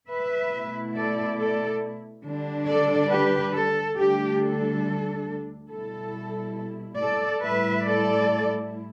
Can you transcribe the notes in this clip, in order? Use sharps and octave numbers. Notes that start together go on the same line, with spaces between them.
B4 E5
B2 A3 E4
A4 D5
A4 D5
D3 G3 D4
A4 D5
G4 B4
A4
D2 D3 G3 D4 G4
A4
B2 G3 E4 A4
A4 D5
A2 G3 E4 B4 E5
A4 D5